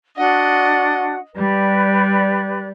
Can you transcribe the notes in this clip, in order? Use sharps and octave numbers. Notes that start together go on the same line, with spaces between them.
D4 F#4 D#5 F#5
G3 G4 B4 D5